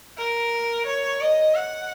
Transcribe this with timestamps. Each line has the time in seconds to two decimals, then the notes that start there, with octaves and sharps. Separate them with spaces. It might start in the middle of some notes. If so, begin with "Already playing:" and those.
0.18 A#4
0.87 C#5
1.22 D#5
1.55 F#5